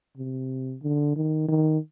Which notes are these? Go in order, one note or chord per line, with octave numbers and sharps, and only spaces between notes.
C3
D3
D#3
D#3